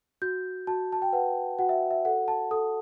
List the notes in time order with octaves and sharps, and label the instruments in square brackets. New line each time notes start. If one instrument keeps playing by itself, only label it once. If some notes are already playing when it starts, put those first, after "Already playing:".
[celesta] F#4 G6
F#4 A5
A5
G5
B4 F#5
F#4 F#5
E5
E5
A4 F#5
A5
A4 D#6